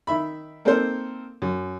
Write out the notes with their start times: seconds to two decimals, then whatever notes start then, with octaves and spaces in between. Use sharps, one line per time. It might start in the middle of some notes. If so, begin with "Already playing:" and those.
0.07 D#3 E5 B5
0.65 A#3 C4 D#4 A4 A#4 C5
1.42 F#2